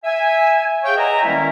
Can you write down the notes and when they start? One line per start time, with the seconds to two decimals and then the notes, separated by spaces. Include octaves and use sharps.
0.04 E5 G#5
0.84 G#4 C#5 F5 G5
0.96 B4 D#5 E5 F#5 G#5 A#5
1.24 D#3 G3 G#3 A#3 C#4 E4